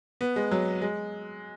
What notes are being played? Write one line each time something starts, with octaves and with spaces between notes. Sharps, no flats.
B3
G#3
F#3
G#3